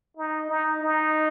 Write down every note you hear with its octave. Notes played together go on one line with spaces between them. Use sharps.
D#4
D#4
D#4